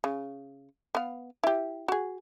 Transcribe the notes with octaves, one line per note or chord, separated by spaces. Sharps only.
C#3
B3 F5
E4 G4
F#4 G#4